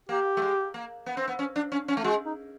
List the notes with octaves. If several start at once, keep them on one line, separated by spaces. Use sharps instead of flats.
A#3 G4
A3
G#3
A#3
B3
C4
B3
C#4
D4
C#4
C#4
A3
G#3 F#4
D#4